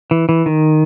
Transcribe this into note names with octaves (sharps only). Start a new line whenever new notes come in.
E3
E3
D#3